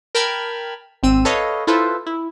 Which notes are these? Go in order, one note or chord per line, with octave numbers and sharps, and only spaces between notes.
A#4 G5 A5 B5 F6 G#6
G#1 C4 E6 D#7
A4 B4 C#5 D#5 F5
E4 F4 A4 B4 C5
E4